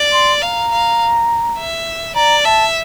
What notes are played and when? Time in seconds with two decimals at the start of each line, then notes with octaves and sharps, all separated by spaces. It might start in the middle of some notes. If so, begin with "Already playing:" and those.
Already playing: D5
0.13 C6
0.42 F5 A#5
0.72 F5
1.58 E5
2.15 D5 A#5
2.45 E5 A5